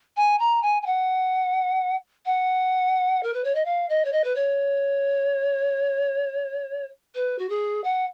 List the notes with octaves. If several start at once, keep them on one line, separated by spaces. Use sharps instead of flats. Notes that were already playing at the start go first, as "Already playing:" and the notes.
G#5
A#5
G#5
G#5
F#5
F#5
A#4
B4
C#5
D#5
F5
D#5
C#5
D#5
B4
C#5
B4
F#4
G#4
F#5